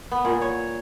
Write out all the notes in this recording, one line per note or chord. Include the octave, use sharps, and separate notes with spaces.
B3
A#2
C#5